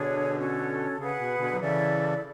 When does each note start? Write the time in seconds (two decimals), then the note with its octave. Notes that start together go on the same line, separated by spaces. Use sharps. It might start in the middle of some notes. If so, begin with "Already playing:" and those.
Already playing: B2 D3 D4 G#4 C#5
0.39 C#4 F#4 A4
0.99 C#3 G#4 B4 F#5
1.19 B2
1.39 B2 D3
1.53 F#3
1.60 C#3 E3 E4 A4 D5